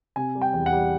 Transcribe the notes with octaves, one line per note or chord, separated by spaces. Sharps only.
C3 G#5
G3
G5
E2
F#5
G3